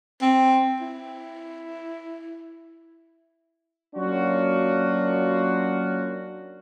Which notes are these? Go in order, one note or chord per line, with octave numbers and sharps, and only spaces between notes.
C4
E4
F#3 A#3 C#4 D4 F4 F#4